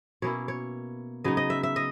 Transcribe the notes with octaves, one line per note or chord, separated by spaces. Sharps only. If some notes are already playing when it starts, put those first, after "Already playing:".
B2 A#3 C#4 E4 C#5
C#5
C#3 F#3 B3 D#4 D#5
D#5
E5
E5
D#5